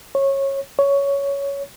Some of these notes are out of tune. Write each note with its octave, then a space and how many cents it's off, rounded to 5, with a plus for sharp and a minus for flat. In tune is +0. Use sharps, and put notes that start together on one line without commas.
C#5 -20
C#5 +10